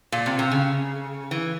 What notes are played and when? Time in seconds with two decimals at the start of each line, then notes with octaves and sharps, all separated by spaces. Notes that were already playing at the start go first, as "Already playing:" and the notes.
0.12 A#2
0.26 C3
0.39 C3
0.51 C#3
1.31 E3